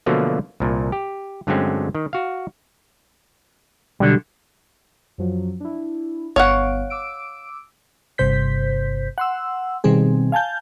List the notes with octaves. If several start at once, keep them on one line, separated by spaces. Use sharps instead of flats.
B2 D3 F3 F#3 A3 A#3
C2 A#2
G4
G2 D3 F#3 G#3 C4 C#4
D#3
F#4 F5
B1 D3 G3
F#2 F3 F#3
D4 E4
G1 B3 C#5 F5 F#5 D7
D6 E6 D7
G1 G2 C3 C5 G6 B6
F#5 C6 E6
B2 D#3 G3 C4 G#4
F5 G#5 A5 G6